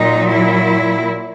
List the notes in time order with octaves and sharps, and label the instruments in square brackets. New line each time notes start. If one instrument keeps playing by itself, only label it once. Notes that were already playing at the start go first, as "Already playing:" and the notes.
Already playing: [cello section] A#2 F#3 D#4
E4